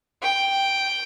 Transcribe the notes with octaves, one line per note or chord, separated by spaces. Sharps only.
G5